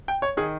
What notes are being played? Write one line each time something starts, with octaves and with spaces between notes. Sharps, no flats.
G5
C#5
D#3 G#4